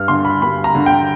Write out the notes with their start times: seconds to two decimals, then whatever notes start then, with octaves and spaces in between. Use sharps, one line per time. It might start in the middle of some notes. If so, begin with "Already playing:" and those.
Already playing: G2 F6
0.08 D3 C6
0.25 B5
0.42 G2 B5
0.64 A#5
0.75 D3
0.86 G5